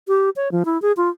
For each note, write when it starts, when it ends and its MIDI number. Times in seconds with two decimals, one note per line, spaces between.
0.08 0.30 67
0.36 0.51 73
0.52 0.63 53
0.65 0.80 64
0.82 0.92 68
0.97 1.09 65